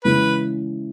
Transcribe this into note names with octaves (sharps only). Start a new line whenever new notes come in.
C#3 E3 G#3 B4